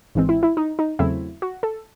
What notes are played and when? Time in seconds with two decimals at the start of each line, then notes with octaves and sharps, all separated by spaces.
0.15 G#1 G#2 E3 G#3 C4
0.29 E4
0.43 E4
0.57 D#4
0.79 D#4
0.99 E2 C#3 F#3 A3 C4 E4
1.42 F#4
1.63 A4